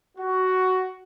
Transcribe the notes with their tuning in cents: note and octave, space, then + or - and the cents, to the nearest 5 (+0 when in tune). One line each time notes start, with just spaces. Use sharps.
F#4 +10